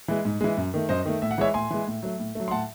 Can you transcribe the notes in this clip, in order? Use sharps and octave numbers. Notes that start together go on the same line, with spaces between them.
E3 G#3
G#2
E3 G#3
F#2
D#3 A3
F#2 C5 D#5
D#3 A3
A2 E5
F#5
E3 G#3 C#5 E5
A2 G#5 C6
E3 G#3
A2
F#3 A3
A2
F#3 A3
C6
A2 F#5 A5